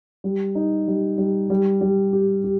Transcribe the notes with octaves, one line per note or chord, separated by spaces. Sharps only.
G3
D#4
G3
G3
G3
G3
G4
G4